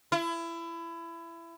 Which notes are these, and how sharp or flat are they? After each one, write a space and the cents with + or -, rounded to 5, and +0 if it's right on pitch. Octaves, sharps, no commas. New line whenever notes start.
E4 +25